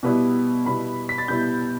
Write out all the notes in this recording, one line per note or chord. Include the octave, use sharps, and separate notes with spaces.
B2 G3 B3 E4
B2 G3 B3 E4 B5
B6
A6
B2 G3 B3 E4 G6